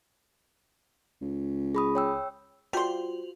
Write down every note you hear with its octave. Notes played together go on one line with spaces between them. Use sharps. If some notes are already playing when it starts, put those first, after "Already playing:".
C#2
G#4 B5 D#6
C#5 G5 E6
G3 F4 F#4 C5 C6